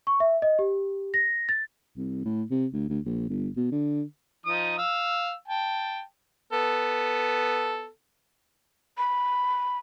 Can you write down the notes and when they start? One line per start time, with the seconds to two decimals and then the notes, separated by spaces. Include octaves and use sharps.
0.07 C#6
0.20 E5
0.42 D#5
0.59 G4
1.14 A#6
1.49 A6
1.97 C2
2.25 A2
2.51 C3
2.73 D2
2.89 D2
3.05 A#1
3.29 G1
3.56 B2
3.71 D3
4.46 F3 D#4 D#6
4.78 F5 E6
5.48 G5 A5
6.53 B3 A4
8.98 B5